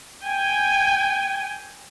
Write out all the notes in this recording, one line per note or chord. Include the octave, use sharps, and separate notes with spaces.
G5 G#5